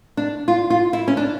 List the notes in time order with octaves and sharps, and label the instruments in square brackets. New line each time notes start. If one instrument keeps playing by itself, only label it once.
[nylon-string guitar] D4
F4
F4
E4
C#4
D4